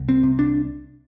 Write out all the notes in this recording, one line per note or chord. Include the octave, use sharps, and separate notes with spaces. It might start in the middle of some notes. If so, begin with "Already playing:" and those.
Already playing: C2
C4
C3
D4